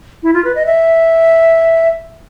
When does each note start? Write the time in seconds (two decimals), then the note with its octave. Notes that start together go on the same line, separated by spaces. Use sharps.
0.23 E4
0.34 F4
0.45 B4
0.55 D#5
0.66 E5